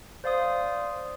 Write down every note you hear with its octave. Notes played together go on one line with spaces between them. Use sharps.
C5 D5 F5 C6 D#6